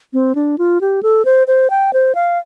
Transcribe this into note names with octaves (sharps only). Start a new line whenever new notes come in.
C4
D4
F4
G4
A4
C5
C5
G5
C5
F5